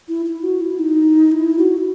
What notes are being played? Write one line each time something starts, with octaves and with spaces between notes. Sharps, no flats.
E4
E4
F#4
E4
D#4
E4
F#4
E4